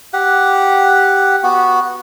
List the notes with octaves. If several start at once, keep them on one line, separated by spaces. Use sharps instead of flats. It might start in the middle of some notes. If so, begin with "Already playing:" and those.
G4 F#5
B3 F#4